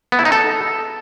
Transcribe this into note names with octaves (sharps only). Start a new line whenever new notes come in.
B3
E4
D#4
A4